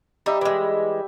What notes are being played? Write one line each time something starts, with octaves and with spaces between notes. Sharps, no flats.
G3 D#4 G4 E5
E3 G#3